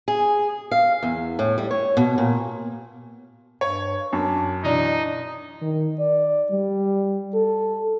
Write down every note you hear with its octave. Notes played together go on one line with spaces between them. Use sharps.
G#4
F5
E2
A2
G3
C#5
B2
A#2
G2 C#5
F#2 D4
B2 E3 D4 D#4
D#3
D5
G3
A4